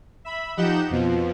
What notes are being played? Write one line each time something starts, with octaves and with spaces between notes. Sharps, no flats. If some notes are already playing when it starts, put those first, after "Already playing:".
E5 B5
F3 D#4 G4 F#5 G6 E7
F2 B2 F3